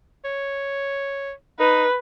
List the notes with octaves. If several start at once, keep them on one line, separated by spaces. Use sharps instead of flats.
C#5
D#4 B4